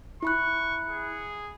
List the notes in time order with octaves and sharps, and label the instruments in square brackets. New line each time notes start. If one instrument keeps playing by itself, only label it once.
[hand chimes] E4 B5 F#6 [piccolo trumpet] C#6
[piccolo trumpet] G#4